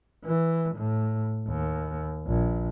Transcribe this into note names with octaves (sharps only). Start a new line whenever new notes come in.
E3
A2
D#2
A#1